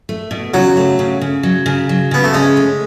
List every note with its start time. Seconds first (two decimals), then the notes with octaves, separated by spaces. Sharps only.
0.09 A3
0.31 B2
0.54 C#3 F#3
0.77 A3
0.99 C#3
1.21 C#3
1.43 F#3
1.66 C#3
1.89 F#3
2.11 C#3 B3
2.24 A3
2.33 G#3 C#4
2.57 A3